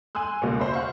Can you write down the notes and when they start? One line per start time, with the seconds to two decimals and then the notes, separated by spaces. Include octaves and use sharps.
0.15 G#5 C6 E6 F#6
0.42 C#2 B2 A#3
0.59 C5 E5 B5
0.73 D5 F5 F#5 C#6